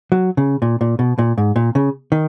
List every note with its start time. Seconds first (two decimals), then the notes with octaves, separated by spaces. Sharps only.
0.12 F#3
0.37 C#3
0.62 A#2
0.81 A#2
0.99 B2
1.18 A#2
1.38 G#2
1.56 A#2
1.75 C#3
2.12 D#3